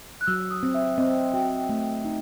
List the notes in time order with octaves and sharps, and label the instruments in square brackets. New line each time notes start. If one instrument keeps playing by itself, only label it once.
[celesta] F#6
[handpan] F#3 [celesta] E6
[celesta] D#6
[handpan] C4
[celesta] E5
[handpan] C4 [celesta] D#5
[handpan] F#4 [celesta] G5
[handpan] A3
D#4